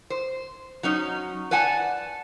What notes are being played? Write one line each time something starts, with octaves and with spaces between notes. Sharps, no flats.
C5
F#3 C#4 D#4
B4 D5 F#5 G#5 A5